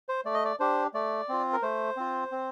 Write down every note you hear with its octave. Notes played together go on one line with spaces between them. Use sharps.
C5
A3 D5
D#5
D5
D4 G4 C5
A3 D5
C4 F4
A#4
A3 C5
C4 F4
C4